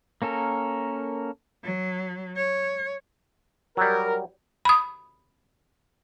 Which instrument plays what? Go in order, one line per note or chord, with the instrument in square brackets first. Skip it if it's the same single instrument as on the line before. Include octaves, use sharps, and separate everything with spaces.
[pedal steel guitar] A#3 C#4 A4 A#4
[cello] F#3
C#5
[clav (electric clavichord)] F#3 G3 [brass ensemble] A#4
[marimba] B5 D#6